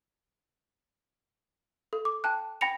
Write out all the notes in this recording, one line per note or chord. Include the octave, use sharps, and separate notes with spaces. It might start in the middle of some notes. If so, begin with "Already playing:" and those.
A4
D6
G5 A5 F#6
G5 B5 A#6 C#7 F7